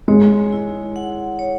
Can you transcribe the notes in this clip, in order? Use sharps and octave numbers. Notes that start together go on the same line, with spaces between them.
G#3 C#5
E4
F#5
C#5